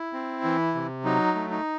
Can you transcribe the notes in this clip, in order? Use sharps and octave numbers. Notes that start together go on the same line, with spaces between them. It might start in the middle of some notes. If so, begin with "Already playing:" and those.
Already playing: E4
C4
E3
C3
F#3 D#4
A3
D#4